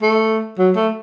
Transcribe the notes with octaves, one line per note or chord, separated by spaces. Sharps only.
A3
F#3
A3